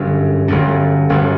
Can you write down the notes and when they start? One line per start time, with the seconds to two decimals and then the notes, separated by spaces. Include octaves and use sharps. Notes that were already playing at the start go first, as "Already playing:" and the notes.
Already playing: G1 F#2 D3
0.48 G1 F#2 D3
1.09 G1 F#2 D3